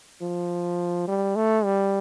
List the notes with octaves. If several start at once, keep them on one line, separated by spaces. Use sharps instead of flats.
F3
G3
A3
G3